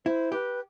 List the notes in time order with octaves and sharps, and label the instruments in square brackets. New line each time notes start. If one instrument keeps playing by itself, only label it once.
[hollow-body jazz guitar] E4 [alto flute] C5
[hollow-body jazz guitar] G4 [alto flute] B4